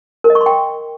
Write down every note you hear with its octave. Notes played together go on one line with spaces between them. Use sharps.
A#4
D#5
C#6
C6
G5